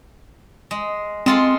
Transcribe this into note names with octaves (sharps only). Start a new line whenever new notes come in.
G#3
G#3 C4 F4 A4